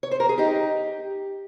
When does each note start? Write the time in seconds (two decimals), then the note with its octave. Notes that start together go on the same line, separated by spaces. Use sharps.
0.03 C#5
0.11 C5
0.20 A#4
0.29 G#4
0.38 D#4 G4